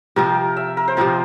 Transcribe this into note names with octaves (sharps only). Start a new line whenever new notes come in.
C3 F3 C4 F4 A#4
E5
A#4
C5
C3 F3 C4 F4 A#4